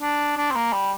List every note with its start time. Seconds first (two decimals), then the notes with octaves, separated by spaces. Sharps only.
0.01 D4
0.37 D4
0.51 C4
0.55 A#3
0.73 G3